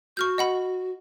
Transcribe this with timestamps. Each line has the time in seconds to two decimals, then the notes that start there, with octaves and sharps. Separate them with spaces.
0.17 F#4 C#6 F6 G6
0.38 D#5 F#5 B5